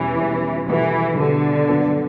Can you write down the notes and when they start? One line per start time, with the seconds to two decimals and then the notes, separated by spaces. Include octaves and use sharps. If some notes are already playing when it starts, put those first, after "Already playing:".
Already playing: E2 B2 E3 G3 C#4
0.20 E2 B2 G3 C#4
0.69 B2 E3 G3 B3 F#4 A4
1.19 B2 D3 G3 B3 F#4 A4
1.68 G2 F#3 B3 D4 A4